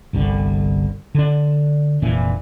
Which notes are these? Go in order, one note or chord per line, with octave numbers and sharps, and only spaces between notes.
G1 C2 D3
D3 D4
F1 A#2 E3 D4